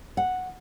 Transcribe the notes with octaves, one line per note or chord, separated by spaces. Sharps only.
F#5